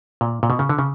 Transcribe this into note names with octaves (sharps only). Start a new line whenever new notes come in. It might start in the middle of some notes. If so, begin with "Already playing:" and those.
A#2
A#2
B2
C#3
D3
C#3